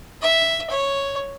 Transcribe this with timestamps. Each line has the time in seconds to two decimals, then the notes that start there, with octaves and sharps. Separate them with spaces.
0.22 E5
0.70 C#5